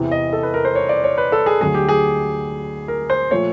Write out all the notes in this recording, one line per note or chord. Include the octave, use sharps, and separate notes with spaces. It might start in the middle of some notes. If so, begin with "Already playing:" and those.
Already playing: E2 C3 E3
D#5
A4
B4
A#4
C5
C#5
D5
C#5
B4
A4
G#4
D2 D3 F#3 G#4
G4
G#4
A#4
C5
A#2 F3 A3 C#5